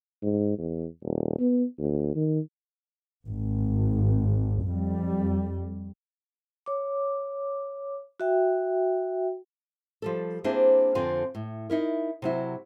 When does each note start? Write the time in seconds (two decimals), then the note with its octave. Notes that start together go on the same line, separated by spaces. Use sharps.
0.23 G#2
0.58 E2
1.03 D#1
1.40 B3
1.79 D2
2.16 D#3
3.26 G#1
4.64 F2 G3
6.66 C#5 D6
8.20 F#4 E5 G5
10.02 F3 G3 A4
10.44 A#3 C4 D4 E4 G#4 C5
10.95 F2 D3 C4 F4 F5 G#5
11.35 A2
11.70 D#4 E4 A#4
12.22 C3 F#3 E4